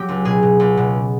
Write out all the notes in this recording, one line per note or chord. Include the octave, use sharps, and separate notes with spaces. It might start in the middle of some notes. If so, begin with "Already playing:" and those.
Already playing: F#3 G4
C#2
B2 G#4
B2
C#2
B2